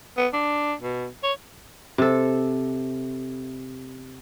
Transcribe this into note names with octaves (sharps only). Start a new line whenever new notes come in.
B3
D4
B2
C#5
C3 A4